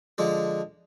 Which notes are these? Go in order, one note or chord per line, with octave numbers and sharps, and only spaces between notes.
D3 F3 G#3 D4 A4